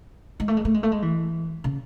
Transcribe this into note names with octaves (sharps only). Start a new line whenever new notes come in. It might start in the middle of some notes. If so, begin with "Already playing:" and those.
G#3
A3
G#3
A3
G#3
A3
G#3
E3
C#3